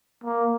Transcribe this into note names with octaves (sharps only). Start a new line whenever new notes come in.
A#3